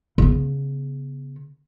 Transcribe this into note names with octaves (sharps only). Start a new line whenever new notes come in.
C#3 B3